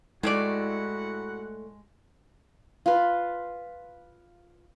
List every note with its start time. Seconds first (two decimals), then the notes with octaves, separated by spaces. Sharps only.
0.23 A2 G#3 A3 E4 F#4 D5 F#5
2.86 F4 B4